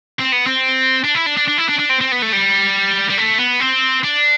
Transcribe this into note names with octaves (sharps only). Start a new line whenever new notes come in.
C4
B3
C4
D4
E4
D4
D4
D4
E4
D4
D4
C4
C4
B3
A3
G3
G3
A3
B3
C4
D4